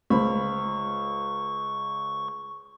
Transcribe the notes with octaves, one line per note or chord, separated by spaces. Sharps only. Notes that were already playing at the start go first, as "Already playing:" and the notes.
C#2 C5 B5 C#6